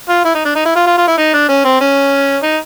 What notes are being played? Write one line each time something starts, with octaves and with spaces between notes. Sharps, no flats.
F4
E4
D#4
D4
D#4
E4
F4
F4
F4
E4
D#4
D4
C#4
C4
C#4
D#4